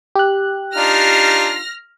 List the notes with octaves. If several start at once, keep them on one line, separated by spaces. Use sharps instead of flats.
G4 F#6
D4 D#4 F4 F6 A#6